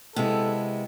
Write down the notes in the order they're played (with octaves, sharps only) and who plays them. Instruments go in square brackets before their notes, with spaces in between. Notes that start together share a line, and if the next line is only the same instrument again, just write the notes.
[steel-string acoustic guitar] C3 G#3 B3 E4 [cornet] A4